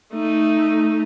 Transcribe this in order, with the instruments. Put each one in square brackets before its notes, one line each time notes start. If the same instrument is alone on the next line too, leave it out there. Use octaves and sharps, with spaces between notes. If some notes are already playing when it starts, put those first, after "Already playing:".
[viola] A3 D#4